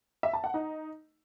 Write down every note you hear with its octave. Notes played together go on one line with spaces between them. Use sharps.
E5
A5
F#5
D#4